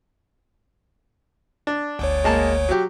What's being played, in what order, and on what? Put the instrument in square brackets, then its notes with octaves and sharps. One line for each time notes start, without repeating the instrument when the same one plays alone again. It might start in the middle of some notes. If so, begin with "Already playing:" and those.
[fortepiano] D4
[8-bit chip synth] G1 D2 C#5
[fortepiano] G#3 A#3 A5
F#3 G4